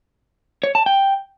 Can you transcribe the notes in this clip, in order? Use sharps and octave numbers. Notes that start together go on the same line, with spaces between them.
C#5
A5
G5